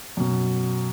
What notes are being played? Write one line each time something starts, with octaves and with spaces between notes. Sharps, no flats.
F#2 B2